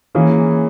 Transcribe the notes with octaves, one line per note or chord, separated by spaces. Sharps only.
E3 A#3 C#4 G#4